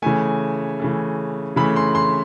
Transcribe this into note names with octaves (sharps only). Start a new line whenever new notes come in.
C#3 E3 A3 G#5
C#3 E3 A3
C#3 E3 A3 B5
C6
C6